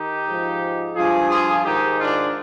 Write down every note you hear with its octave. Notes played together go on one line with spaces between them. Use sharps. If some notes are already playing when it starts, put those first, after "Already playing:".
Already playing: D#3 D#4 G4
G#2 F3
G2 F3 F4 G#4
F4 G#4
G#2 D#3 D#4 G4
D4 F4